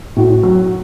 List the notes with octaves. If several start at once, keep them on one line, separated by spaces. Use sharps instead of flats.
A2 F#4
F#3